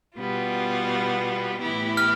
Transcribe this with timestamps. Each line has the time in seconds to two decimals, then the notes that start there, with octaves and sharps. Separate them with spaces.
0.16 B2 G3 B3 F4
1.61 A2 E3 B3 E4 G4
1.97 F6